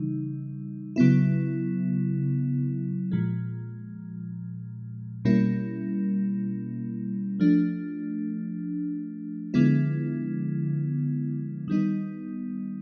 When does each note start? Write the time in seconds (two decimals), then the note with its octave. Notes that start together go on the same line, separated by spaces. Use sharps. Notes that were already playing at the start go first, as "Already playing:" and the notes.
Already playing: C#3 E3 G3 D#4
0.96 C#3 F#3 B3 E4
3.11 A#2 F3 G#3
5.25 B2 G3 A#3 C#4 E4
7.40 F3 A3 D4
9.54 D3 F3 G#3 B3 E4
11.68 D#3 G3 B3 D#4